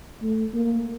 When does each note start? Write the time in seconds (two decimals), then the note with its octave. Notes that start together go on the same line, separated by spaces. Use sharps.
0.22 A3
0.54 A#3